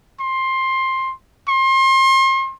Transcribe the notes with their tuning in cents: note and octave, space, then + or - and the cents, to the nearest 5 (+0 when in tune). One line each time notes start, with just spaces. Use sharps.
C6 +15
C6 +35